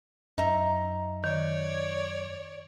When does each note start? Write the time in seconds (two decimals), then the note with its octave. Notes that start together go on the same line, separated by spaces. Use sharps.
0.38 F#2 D#4 E5 A#5
1.24 D#3 C#5 D5